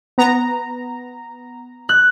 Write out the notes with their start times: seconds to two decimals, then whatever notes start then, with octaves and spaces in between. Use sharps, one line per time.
0.18 B3 A#5
1.89 F#6